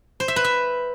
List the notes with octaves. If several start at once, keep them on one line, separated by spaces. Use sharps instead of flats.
C5
E5
B4
E5